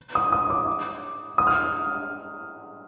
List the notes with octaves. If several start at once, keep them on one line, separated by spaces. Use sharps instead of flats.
D#6
D#6
D6
D#6
F6